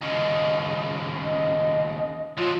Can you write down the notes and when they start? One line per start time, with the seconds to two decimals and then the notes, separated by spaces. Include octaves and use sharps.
0.02 D#2 C#3 D#5
1.22 D#5
2.38 F3 F#3 F4